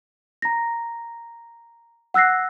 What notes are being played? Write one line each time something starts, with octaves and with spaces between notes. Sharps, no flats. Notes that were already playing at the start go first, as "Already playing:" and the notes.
A#5 A#6
F#5 E6 F#6 A#6 C7